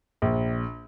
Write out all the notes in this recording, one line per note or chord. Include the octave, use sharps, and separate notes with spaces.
A#1